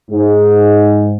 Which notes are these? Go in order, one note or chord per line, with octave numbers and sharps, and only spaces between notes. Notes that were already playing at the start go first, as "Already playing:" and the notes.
G#2